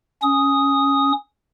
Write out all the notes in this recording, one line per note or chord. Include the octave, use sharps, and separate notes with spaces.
C#4 D#6